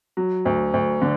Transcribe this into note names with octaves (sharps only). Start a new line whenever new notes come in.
F#3
D2
D2
D3